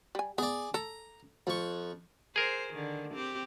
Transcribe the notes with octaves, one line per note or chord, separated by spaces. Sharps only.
G3 G#5
B3 G#4 D5
A4 A#5
F2 C#6
G#4 A#4 C5
D3 D#3
C4 G4